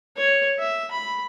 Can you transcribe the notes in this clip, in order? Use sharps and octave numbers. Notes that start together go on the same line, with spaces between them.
C#5
E5
B5